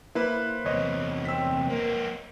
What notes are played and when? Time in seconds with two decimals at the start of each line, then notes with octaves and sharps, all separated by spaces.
0.15 A#3 E4 B4 C5 B5
0.66 E2 C3 C#5 D#5 C#6
1.25 C4 E6 B6
1.70 A#3 C4 A#4